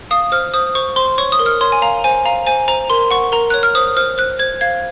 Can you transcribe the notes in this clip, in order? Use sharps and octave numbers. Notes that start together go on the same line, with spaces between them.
F5 D#6
C5 F6
C5 D#6
C5 C#6
C5 C6
C#5 C#6
D#6
A#4
F6
C#5 C6
G#5
F5 A#5
C5 G#5
F5 A#5
C5 G#5
C5 A#5
A#4 C6
F#5 C#6
A#4 A#5
C#5 F#6
F6
C5 D#6
C5 F6
C5 F#6
C5 G#6
F5 G#6